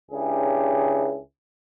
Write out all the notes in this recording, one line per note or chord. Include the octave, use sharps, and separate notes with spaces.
C#2 C#3 D4 E4 G4 G#4